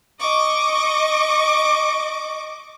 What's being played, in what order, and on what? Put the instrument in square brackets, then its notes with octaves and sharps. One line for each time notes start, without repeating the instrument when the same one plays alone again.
[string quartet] D#5 C#6 D6